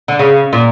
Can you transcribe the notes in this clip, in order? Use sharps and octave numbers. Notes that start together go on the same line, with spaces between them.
D3
C#3
A#2